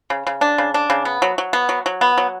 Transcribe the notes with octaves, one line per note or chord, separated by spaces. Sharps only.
C#3
C#3
D4
C#3
D4
C#3
B3
F#3
F#3
B3
F#3
F#3
B3
F#3